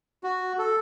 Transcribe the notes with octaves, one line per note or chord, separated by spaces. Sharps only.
F#4
A4